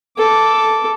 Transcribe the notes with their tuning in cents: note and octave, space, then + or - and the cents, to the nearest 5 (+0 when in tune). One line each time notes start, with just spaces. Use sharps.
A4 +0 D6 -10